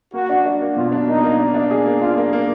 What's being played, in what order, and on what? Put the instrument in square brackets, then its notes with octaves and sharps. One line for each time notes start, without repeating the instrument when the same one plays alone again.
[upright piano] A#3 [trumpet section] F#4
[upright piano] D4
D4
A#3
[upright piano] B2 [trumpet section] F4
[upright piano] D4
[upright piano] A#3 [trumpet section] D#4
[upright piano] A#3
D4
D4
G#4
A#3
[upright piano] D4 [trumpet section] F4
[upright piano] A#3
A#3